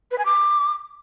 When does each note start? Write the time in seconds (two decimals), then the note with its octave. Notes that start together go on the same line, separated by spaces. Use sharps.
0.11 B4
0.18 G#5
0.25 D6